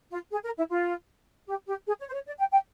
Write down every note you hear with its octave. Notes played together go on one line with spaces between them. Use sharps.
F4
G#4
A#4
E4
F4
G4
G4
G#4
C#5
C5
C#5
D5
G5
G5